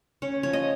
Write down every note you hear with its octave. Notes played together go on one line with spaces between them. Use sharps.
C#4 C#5
F3 C#5
D#5